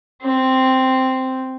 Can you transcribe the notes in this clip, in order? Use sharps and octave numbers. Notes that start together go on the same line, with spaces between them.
C4